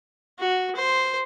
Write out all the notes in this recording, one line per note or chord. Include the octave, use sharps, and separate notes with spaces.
F#4
C5